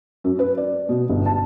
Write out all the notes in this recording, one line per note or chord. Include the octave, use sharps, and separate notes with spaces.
F#2
B4
D5
B2
G1
A5